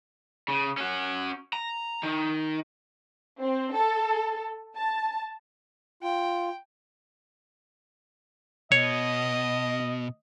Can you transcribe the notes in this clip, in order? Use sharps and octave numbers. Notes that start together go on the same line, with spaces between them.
C#3
C#4 F#4
A#5
D#3
C4
A4
A5
F4 G5
B2 C#5 D#5